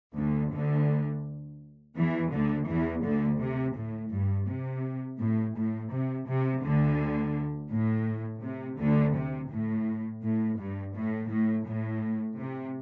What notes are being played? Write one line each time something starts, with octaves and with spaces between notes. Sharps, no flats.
D2 D3
D2 D3
E2 E3
D2 D3
E2 E3
D2 D3
C3
A2
G2
C3
A2
A2
C3
C3
D2 D3
A2
C3
D2 D3
C3
A2
A2
G2
A2
A2
A2
C3